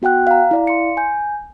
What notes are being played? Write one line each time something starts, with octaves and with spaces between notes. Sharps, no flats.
B3 F#4 F#5 G5 F#6
F5 A#5
E4 D5 F5
C6 C#7
G#5 G6